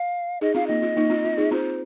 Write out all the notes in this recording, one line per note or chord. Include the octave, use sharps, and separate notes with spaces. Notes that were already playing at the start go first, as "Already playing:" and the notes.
Already playing: F5
D#4 G#4 D#5
C4 F4 F5
A#3 D#4 D#5
C4 F4
A#3 D#4
C4 F4
C4 F4
D#4 G#4
C4 F4 C5